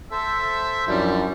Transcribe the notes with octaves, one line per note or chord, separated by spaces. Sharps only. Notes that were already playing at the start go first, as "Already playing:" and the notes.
A4 C5 E5 A5
F#2 F3 G3 D4 E4